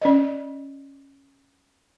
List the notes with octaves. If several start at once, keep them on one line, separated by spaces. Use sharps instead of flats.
C#4 D5 D#5